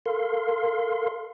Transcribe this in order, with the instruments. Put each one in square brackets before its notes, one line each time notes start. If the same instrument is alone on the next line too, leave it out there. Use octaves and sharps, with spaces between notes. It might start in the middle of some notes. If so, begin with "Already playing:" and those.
[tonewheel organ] A4 A#4 F5 C6